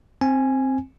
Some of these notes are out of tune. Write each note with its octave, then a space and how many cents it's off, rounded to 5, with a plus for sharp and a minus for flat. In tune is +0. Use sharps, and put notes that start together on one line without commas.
C4 +10 G#5 +0